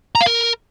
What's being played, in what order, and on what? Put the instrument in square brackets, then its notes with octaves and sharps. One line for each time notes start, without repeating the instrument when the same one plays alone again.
[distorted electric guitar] A#5
F5
A#4